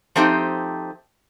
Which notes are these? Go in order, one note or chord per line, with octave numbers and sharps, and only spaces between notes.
F3 A3 C4 D#4 G4